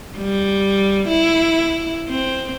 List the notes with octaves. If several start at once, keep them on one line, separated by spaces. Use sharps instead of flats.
G3
E4
C4